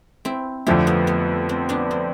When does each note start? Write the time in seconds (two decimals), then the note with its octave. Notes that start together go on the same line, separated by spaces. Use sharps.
0.25 C4 E4
0.66 F2 D3 F3 A3 E4 G4
0.87 B3
1.07 B3
1.49 C4
1.69 B3 D4
1.91 C4